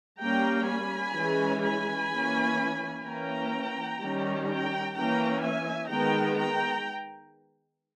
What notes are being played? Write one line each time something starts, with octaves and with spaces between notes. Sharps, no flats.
G3 A#3 C#4 G5 A#5
G#5 B5
E3 G#3 C#4
G#5 B5
E3 A#3 C#4
E3 A#3 C#4 G5 A#5
D#3 G3 C#4
G5 A#5
E3 A#3 C#4 G5 A#5
E5 G#5
D#3 G#3 B3 G5 A#5
G5 A#5